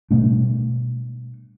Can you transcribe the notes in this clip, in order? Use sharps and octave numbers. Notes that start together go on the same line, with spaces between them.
B2 G3 A3 D4